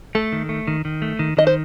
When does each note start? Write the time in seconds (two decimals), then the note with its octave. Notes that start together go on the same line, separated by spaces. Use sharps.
0.15 A3 A4
0.32 D#3
0.49 A3
0.67 D#3
0.85 D#3
1.02 A3
1.19 D#3
1.37 D#3 D#5
1.47 C5